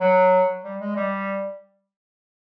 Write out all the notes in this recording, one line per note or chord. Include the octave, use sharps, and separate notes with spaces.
F#3
G3
G#3
G3